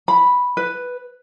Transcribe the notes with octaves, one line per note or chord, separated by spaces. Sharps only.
B5
B4